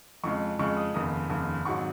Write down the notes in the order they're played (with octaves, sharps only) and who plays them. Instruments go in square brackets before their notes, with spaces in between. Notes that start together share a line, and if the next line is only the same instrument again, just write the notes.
[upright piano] F2 C#3 G#3 C#6
F2 C#3 G#3 C#6
D#6
F1 D#2 C#3 D#6
F1 D#2 C#3
G#1 G#2 F#3 C#6